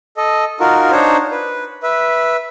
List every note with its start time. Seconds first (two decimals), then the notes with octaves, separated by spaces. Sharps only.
0.17 A4 D#5
0.60 D#4 F4 F#4 A#4
0.92 D4 D#4 C5 C#5
1.31 B4
1.83 B4 E5